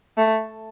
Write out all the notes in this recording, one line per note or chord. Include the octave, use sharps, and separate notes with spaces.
A3